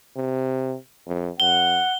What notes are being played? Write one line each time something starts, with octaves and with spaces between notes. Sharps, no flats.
C3
F2
F2 F#5 G7